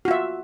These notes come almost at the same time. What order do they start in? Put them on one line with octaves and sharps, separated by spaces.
F#4 F4 E5